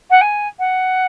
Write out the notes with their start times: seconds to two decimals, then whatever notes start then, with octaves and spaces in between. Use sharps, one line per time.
0.11 F#5
0.21 G#5
0.59 F#5